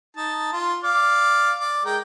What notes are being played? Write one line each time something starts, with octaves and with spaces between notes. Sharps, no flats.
D#4 A5
F4
D5 F5
D5
G#3 A#4 G5